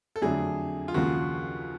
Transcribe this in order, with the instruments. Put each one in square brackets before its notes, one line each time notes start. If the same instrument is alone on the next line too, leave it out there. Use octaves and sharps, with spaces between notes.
[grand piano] A4
[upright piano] F2 D3 F#3 A3 D4 [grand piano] G#4
[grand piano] F4
[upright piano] D#2 C#3 F3 [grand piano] F#4